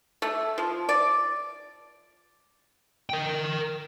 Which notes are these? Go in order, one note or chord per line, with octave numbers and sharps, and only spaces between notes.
A3
F3
D5
A#4 G5